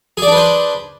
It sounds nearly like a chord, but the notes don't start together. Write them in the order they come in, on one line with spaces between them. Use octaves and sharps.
G#4 D5 D4 B4 C5